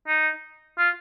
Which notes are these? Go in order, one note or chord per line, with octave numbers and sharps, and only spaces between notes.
D#4
F4